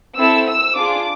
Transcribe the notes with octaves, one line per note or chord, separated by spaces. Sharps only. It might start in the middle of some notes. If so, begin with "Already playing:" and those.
C4 E4 A4 E6
E6
D4 F4 G#4 D6